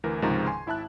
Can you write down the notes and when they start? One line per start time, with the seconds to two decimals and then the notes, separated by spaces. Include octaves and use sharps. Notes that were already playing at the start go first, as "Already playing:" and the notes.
0.04 D2 E3 A#4
0.22 C#2 G#2 C3 D#3 F3 A#5
0.46 G#5 C6
0.66 G#1 E4 E5 A5 F#6